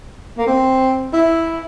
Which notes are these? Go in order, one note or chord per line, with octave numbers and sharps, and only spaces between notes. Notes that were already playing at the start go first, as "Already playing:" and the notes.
A#3
C4
E4